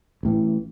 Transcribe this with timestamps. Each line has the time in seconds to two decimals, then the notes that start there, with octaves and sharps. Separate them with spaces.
0.23 A1 A2 E3